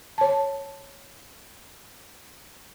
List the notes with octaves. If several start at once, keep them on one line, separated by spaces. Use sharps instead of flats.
C#5 A5